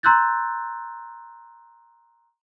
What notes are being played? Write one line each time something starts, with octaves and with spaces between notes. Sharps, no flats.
A#5 C6 E6 F#6 G6 A6